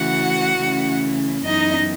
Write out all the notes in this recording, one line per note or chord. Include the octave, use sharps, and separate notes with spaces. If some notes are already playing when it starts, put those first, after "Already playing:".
Already playing: C#3 E3 A3 F#4 F#5
C#3 E3 A3 C#4
F#2 E3 B3 D#4 D#5